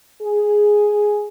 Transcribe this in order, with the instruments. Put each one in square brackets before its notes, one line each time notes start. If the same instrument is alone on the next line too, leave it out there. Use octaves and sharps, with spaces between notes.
[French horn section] G#4